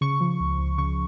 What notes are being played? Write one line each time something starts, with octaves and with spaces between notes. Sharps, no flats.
C#3 C#6
F3
C#2
C#2
C#3 C#6